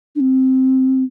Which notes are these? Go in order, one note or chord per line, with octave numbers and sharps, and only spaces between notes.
D4
C4